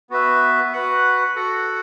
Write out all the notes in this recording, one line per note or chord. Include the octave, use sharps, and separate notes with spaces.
B3 F#4 B4 E5
F#4 B4 F#5
F#4 A4 F#5